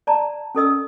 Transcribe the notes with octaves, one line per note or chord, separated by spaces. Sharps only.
D5 A5 A#5
C#4 A4 D#5 E6